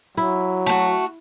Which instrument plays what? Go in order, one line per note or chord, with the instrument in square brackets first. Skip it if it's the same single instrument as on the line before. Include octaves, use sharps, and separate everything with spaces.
[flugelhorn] F#3 [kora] E4
[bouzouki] A3 F#4